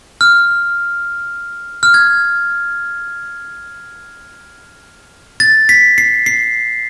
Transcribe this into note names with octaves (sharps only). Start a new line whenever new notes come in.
F6
F6
G#6
A6
B6
C7
C7